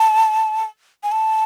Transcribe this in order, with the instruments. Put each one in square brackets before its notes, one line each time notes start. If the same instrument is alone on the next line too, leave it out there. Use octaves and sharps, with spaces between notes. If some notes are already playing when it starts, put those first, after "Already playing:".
Already playing: [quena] A5
G#5
A5